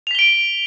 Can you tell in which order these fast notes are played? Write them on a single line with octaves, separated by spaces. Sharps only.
F7 B6 G7 D7